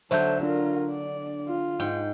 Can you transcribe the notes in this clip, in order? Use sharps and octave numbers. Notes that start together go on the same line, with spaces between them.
D3 F#3 A4 C5 E5 A5 G6
D4 F4 A#4
D5
F4
G#2 G5